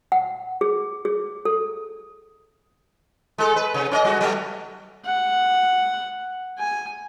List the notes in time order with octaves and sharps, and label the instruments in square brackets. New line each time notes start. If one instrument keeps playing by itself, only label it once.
[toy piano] F#5
G#4
G#4
A4
[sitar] G#3 A4
B4
C3
C#4 C#5 D#5
G3 F#4
F#3 A3 B3
[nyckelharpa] F#5
G#5